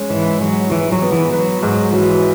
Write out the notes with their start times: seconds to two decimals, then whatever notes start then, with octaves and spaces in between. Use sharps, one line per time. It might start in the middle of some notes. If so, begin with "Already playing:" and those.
Already playing: G#3 C#4
0.10 G#2 E3
0.41 G#2 F#3
0.71 E3 G#3
0.92 F#3
1.02 B3
1.12 E3
1.32 F#3 B4
1.63 G#2 F#3
1.93 E3 F#3